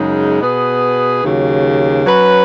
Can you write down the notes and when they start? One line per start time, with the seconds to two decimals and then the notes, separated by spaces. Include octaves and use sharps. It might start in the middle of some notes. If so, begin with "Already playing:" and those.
Already playing: F#2 C#3 G#3 D#4
0.40 B2 B3 G#4 B4
1.22 D#2 C#3 F#3
2.05 F#3 C#4 B4